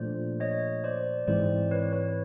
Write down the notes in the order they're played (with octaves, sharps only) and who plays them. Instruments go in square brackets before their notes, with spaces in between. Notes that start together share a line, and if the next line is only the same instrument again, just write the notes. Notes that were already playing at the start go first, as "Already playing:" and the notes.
Already playing: [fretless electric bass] A#2 F3 A3 D4 [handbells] C5 D5
[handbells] C#5 D#5
C5 D5
[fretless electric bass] G#2 E3 G#3 C4 [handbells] C5 D5
[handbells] B4 C#5
B4 C#5